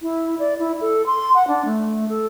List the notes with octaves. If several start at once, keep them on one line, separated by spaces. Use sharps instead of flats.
E4
D5
E4
A4
C6
F#5
D4
A3
A4